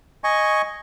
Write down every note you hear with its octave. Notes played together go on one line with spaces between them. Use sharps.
D#5 G#5 C#6